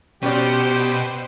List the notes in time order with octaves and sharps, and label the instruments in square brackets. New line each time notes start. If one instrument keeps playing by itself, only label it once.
[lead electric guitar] B2 [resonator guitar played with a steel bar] C#4 F#4 D5 [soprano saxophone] G4 [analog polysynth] B4 C5